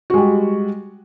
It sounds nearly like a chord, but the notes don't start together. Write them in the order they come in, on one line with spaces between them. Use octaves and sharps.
F#4 G#3 G3